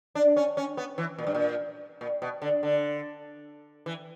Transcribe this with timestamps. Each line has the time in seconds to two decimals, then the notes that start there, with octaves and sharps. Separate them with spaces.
0.15 D4
0.36 C#4
0.57 C#4
0.77 B3
0.98 E3
1.18 A#2
1.27 G2
1.35 A#2
2.01 A#2
2.22 B2
2.42 D3
2.63 D3
3.86 E3